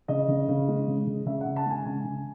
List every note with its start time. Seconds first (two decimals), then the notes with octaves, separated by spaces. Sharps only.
0.08 C#3 D#5
0.28 C#3
0.48 C#3
0.68 G#3
0.88 C#3
1.07 C#3
1.26 C#3 E5
1.41 F#5
1.46 C#3
1.56 A5
1.66 G#3 G#5
1.85 C#3 G#5
2.04 C#3